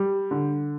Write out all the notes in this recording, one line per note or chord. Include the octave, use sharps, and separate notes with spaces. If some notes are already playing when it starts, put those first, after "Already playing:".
Already playing: G3
D3